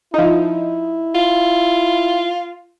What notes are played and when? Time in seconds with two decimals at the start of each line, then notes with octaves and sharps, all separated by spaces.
0.14 F3 D#4 E4
1.15 F4